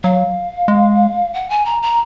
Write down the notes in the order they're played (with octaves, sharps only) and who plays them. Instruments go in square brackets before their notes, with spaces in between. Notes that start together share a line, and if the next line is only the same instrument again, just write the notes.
[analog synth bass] F#3 [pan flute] F5
[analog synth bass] G#3
[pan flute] F#5
G#5
A#5
A#5